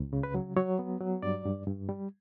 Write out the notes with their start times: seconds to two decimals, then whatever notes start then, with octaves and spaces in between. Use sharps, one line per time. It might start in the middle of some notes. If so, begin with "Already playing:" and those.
Already playing: C#2
0.13 C#3
0.23 B4
0.35 F#3
0.57 F#3 C#5
0.79 B3
1.01 F#3
1.23 G2 D5
1.45 G2
1.67 G2
1.89 G3